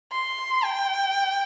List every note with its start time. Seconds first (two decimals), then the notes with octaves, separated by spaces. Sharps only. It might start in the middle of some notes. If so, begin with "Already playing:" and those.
0.12 C6
0.65 G5